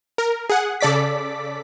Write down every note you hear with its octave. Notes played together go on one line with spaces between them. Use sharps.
A#4
G#4 F#5
C#3 A4 D5 D6 B6